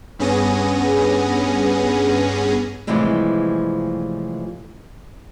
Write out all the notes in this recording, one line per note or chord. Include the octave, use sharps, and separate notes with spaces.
G2 B3 C#4 G#4 A#6 D#7
A2 C3 E3 F3 G3 G#3